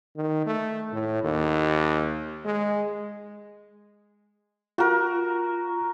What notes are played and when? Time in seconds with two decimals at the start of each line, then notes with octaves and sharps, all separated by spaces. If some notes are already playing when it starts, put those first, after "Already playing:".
0.16 D#3
0.47 A3
0.92 A2
1.23 D#2
2.45 G#3
4.78 F4 F#4 A#4